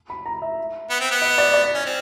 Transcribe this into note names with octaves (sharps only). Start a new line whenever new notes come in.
B5
A#5
E5
B3
C4
B3
D#5
D5
D5
C#4
C4